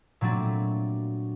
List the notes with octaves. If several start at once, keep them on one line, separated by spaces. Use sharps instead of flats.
A#2 F#3 A3 C4 D4